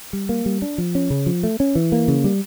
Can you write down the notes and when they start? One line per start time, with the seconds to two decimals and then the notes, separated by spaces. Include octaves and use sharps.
0.13 G3
0.29 A#3
0.46 G3
0.62 D4
0.78 F3
0.95 C#4
1.10 C#3
1.26 F3
1.43 A3
1.60 C#4
1.75 E3
1.92 A#3
2.08 C#3
2.24 G3